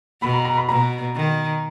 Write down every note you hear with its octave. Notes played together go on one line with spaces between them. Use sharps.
B2 B5
A#5
A#5
B5
B2 A#5
D#3